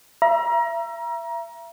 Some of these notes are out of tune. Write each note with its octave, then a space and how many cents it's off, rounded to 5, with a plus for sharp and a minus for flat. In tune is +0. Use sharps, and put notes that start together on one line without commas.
E5 +30 A#5 +25